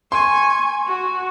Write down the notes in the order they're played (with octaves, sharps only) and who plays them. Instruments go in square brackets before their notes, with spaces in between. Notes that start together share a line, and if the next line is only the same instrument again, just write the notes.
[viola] G#5 C#6 [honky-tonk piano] C6
[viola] F#4